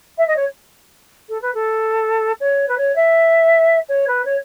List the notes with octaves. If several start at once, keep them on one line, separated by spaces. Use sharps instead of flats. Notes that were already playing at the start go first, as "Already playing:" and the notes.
E5
D#5
C#5
A4
B4
A4
C#5
B4
C#5
E5
C#5
B4
C#5